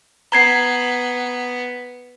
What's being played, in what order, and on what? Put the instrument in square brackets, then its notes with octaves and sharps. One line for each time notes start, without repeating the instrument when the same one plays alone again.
[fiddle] B3 [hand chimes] A#5 G#6 C7